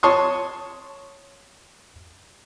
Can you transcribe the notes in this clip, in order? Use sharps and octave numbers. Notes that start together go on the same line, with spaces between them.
C#5 A5 C6 C#6 D#6